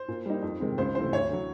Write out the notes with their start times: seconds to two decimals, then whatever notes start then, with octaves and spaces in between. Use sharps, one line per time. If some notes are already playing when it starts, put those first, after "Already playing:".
Already playing: C5
0.08 A#2
0.26 G3 A#3 D#4
0.43 F2
0.60 C3 D#3 G#3 C4
0.78 C#2 C5
0.95 C3 E3 A3 C5
1.12 D2 C#5
1.30 D3 F#3